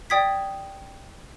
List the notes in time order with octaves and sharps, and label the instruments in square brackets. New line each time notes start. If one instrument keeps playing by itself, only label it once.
[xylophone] D5 G5 D#6 G#6 B6